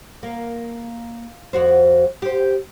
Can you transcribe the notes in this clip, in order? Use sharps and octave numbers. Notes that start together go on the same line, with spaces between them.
A#3
F2 F#4 C5
G4 C5